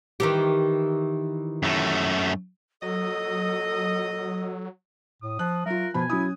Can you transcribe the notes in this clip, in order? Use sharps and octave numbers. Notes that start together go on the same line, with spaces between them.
D#3 E3 G4
F#2 A3
A#2 F#3 A4 D#5
A2 D#6
F3 F#6
F#3 F4 A#4 E5
B2 F3 G#5 B5
F#3 C#4 E4 D#6